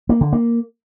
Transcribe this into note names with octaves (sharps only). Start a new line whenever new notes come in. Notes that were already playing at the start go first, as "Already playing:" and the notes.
A#3
D3
A#3